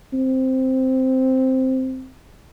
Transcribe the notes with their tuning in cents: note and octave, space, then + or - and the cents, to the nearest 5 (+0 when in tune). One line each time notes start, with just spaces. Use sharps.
C4 +0